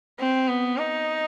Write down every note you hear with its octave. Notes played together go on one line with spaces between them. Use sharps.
C4
B3
D#4